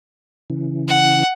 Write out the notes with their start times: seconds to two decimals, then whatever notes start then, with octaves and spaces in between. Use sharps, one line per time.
0.50 C#3 E3
0.88 F#5